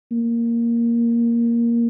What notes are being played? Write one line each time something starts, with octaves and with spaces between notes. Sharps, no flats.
A#3